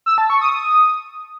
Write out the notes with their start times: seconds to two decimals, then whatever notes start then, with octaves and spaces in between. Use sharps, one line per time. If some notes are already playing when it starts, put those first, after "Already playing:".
0.06 E6
0.18 A5
0.30 C#6
0.41 D#6